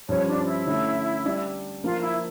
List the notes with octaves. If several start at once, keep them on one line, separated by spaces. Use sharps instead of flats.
G2 F3 C#4 C#5
D4
E4
D3 A3 C#4
G3 D4 G4 D5
F3 A#3 D4 F4
E4